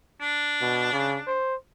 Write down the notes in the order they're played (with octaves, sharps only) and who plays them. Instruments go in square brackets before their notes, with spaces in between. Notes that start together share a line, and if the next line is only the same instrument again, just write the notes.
[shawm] D4
[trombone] B2
C#3
C5